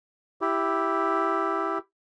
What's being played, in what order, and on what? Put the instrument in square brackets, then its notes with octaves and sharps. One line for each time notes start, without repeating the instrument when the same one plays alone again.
[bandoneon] E4 G4